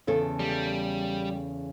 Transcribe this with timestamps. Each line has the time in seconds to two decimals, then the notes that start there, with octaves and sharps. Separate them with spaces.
0.07 E2 C#3 A4
0.39 G3